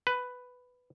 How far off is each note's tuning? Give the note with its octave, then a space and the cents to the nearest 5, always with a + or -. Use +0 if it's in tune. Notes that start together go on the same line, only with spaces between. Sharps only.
B4 +5